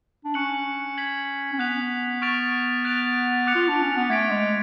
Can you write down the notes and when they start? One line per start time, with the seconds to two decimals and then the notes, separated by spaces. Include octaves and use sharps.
0.25 D4
0.34 C#4 C#6 F#6 C#7 F#7
0.97 G#6 B6 F#7
1.53 C#4
1.59 B3 F#6 B6 F7
2.22 C#6 F6 A6 D7 F7
2.84 F#6 A6 D7 F7
3.47 D6 F#6 C#7 F7
3.55 F4
3.68 D4
3.82 C#4
3.96 B3
4.10 A3 G#6 B6 D7
4.30 G#3